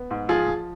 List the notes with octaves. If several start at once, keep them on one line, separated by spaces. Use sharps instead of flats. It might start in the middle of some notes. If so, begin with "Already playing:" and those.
Already playing: B3
G#2
F3 F4 G#4
F3